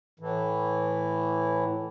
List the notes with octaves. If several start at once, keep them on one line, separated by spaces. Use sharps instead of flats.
A2 E3